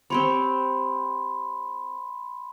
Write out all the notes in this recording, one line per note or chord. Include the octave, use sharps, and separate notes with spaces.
C4 G4 C#5 B5 C6